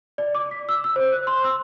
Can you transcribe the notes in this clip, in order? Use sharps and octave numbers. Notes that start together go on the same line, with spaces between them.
D5
D6
B6
E6
E6
C5
F#6
C6
E6